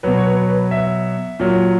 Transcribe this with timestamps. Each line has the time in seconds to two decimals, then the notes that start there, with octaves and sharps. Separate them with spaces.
0.03 B2 F#3 B4
0.18 C#5
0.26 B4
0.49 B4
0.71 E5
1.40 A#2 F#3